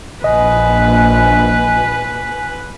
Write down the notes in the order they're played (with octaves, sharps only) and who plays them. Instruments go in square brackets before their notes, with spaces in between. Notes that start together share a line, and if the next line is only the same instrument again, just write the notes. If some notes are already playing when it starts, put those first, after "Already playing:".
[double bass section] A#1 [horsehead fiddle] B4 [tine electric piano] D#5 [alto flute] G#5